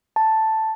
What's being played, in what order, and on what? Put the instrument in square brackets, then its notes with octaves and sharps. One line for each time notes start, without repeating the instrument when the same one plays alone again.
[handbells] A5